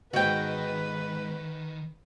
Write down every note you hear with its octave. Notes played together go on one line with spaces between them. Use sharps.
G#2 B2 D#3 F#4 B4 G5